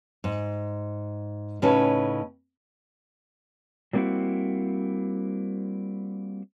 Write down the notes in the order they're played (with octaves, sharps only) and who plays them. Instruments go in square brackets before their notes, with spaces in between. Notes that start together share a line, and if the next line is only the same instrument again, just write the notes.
[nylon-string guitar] G#2
A2 C#3 C#4 D#4 B4 A5
[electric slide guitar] F#3 G3 A#3 C4 E4 F#4